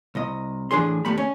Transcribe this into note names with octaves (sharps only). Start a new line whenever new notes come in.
C2 D#5
A2 E3 D4 G#4 C6
D#2 A#2 G3 A3 B5
C#4